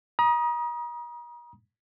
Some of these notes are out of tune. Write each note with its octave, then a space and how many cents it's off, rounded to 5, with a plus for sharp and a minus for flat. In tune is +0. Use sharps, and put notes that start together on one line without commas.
A#5 +40 D#6 +0